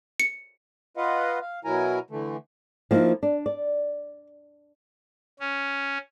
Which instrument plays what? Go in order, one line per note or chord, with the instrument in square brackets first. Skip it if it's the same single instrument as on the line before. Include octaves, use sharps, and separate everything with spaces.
[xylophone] C#7
[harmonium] F4 B4 D#5 F5 F#5
F5
B2 F#3 E4 A#4 G#5 A#5
D3 E3 A3
[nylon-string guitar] F3 A#3 D#4 E4
D4
D5
[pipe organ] C#4